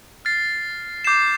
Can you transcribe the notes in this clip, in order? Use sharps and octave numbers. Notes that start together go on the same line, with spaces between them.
F6 A6 C7
D6 G6 C7 E7